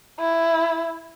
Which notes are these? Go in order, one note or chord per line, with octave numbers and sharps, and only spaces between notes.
E4